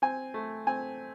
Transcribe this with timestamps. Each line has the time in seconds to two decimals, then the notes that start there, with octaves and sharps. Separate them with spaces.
0.02 C4 G#5
0.34 A3
0.67 C4 G#5